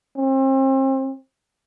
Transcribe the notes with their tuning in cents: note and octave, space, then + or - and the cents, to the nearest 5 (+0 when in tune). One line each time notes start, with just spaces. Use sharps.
C4 +35